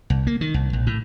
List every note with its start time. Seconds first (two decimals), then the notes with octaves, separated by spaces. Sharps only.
0.10 C2
0.27 A#3
0.41 D#3
0.54 C2
0.73 A#1
0.87 A2